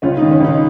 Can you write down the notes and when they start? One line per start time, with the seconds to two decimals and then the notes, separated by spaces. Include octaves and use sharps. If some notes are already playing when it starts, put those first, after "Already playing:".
0.02 C#2 C#4 F4
0.17 D#3 D#4
0.31 C#4
0.40 C#2 D#4